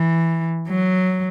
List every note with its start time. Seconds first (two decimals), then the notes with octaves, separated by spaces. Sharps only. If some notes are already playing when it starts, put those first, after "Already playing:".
Already playing: E3
0.68 F#3